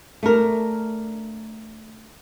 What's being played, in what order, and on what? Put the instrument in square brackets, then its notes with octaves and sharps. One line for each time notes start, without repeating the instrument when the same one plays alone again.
[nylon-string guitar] A3 D4 A#4